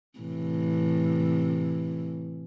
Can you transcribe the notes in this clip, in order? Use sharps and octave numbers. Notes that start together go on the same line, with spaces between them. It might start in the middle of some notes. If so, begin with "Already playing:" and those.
A2 C3 E3